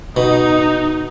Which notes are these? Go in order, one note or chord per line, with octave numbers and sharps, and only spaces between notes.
B2 D#4